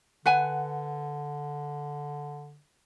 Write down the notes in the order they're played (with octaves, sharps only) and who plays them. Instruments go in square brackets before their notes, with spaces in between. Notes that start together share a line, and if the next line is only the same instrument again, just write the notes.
[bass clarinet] D3 [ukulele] B4 F#5 G#5